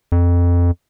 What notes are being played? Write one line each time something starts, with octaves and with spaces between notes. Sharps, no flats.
F2